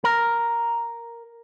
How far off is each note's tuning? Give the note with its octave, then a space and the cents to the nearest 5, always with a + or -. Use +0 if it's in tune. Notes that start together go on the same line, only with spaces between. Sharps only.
A#4 +0